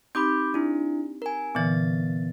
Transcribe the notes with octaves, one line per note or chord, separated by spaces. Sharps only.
C4 D#4 G4 B5 D6 G6
D4 E4
A#4 G#5
A#2 D3 E3 B3 A6